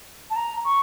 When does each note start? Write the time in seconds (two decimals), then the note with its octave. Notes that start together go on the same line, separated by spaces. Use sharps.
0.30 A5
0.36 A#5
0.65 C#6